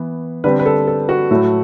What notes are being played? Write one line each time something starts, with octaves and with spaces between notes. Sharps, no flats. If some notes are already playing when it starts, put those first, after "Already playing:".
Already playing: E3 B3
D3 G3 C4 B4
B4
A4
A4
F#4
A2 F#3 A3